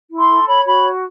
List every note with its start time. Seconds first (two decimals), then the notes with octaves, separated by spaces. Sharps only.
0.09 E4
0.18 C6
0.28 A4
0.46 C#5 B5
0.64 F#4 B5